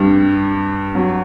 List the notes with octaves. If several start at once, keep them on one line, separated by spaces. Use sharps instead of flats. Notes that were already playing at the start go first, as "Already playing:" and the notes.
Already playing: G2 G3
F#3